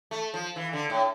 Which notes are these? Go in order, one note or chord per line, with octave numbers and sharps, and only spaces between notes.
A3
F3
E3
D3
A2